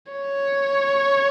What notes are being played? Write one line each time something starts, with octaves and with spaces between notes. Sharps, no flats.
C#5